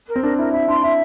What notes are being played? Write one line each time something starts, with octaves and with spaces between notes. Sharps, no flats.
A#4
C4
D4 A#4
E4 A#4
E4 E5
D4 C6
E4 E5